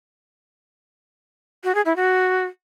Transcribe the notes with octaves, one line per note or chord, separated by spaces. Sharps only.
F#4
G#4
E4
F#4